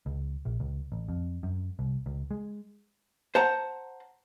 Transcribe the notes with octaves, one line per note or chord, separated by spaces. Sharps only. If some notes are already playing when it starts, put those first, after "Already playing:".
C#2
A#1
C#2
A1
F2
F#2
C2
C#2
G#3
C5 F#5 A5 A#5